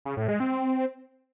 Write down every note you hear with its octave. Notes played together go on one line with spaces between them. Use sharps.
C#3
A2
G#3
C4